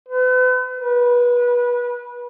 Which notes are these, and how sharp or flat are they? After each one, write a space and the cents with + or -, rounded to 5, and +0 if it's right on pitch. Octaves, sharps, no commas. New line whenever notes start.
B4 +40
B4 -25